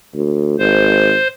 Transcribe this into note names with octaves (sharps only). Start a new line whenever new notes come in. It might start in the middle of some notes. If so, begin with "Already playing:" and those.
D2
G#1 C5